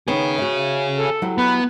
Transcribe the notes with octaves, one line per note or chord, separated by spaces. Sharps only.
D#3 B3 C#4 G#4 C#5
F#4 E5
A4
F#3 E4 G4
B3 B4